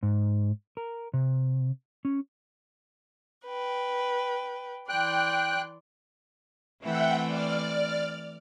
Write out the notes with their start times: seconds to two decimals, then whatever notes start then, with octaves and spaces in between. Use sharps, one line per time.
0.03 G#2
0.77 A#4
1.14 C3
2.05 C#4
3.45 B4 G5
4.89 E3 D5 G5 C6 F#6
6.82 E3 A3 C4 E5 F#5 G5
7.26 D5 F6